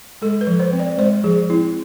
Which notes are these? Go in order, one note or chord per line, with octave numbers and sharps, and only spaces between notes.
G#3 A4
B4
F3
C5
C4
D5
G#3 C5
F3 G#4
C4 E4